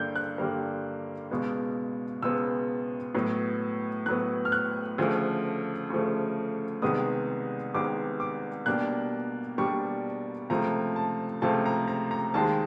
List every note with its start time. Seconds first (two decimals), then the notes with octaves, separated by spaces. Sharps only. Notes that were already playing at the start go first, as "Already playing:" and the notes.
Already playing: G2 D3 G3 A#3 G6
0.16 F#6
0.38 G2 D3 G3 A#3
1.31 C#2 B2 G#3 B3
2.22 C#2 B2 G#3 B3 E6
3.15 A2 F#3 B3
4.06 A2 F#3 B3 F#6
4.45 F6
4.52 F#6
4.98 D2 C#3 F3 A3
5.90 D2 C#3 F3 A3
6.82 C2 C3 D#3 G#3 B3 D#6
7.74 C2 C3 D#3 G#3 B3 D6
8.20 D6
8.66 B2 G3 A#3 D4 F#6
9.58 B2 G3 A#3 D4 C#6
10.50 C#2 C3 F3 A3 A#5
10.96 A5
11.42 C#2 C3 F3 A3 A5
11.66 A#5
11.88 A#5
12.11 A#5
12.34 D#2 D#3 G#3 C4 A5